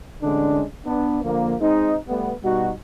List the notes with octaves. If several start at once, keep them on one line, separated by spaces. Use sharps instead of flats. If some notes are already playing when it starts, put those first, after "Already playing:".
A1 D3 G#3 C#4 D4
B3 D4
D3 F3 A#3
G#3 C4 D#4
G3 A3 B3
B2 G3 D#4 F#4